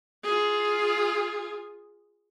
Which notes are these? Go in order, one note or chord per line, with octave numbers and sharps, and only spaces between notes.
F4 G#4